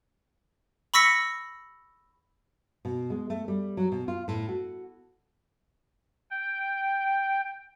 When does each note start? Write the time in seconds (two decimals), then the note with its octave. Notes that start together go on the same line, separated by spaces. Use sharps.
0.94 B5 C#6 E6 A#6 B6 C#7
2.85 B2
3.10 G#3
3.30 A3
3.48 G3
3.77 F#3
3.92 B2
4.08 F4
4.28 A2
4.49 F#4
6.31 G5